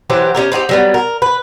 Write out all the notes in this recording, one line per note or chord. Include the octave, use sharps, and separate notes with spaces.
E3 F#3 G4 C5
C#4 D4 G4 A#4
C4 D#4 F#4 G4
F#3 G3 B3
A#4
B4